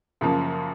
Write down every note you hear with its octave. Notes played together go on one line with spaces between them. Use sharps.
F#2 C#3 F3 A#3